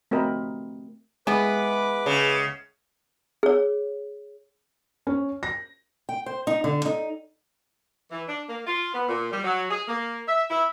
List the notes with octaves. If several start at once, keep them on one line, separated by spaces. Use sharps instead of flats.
A3 C4 F#4 A#4 D#5 B5
E3 G#3 B3 B4 D6
C#3
G#4 C#5
C#4
A#6
G5
C5
D#4
D3
D#4
E3
D4
A#3
F4
B3
A#2
G3
F#3
G#4
A#3
E5
E4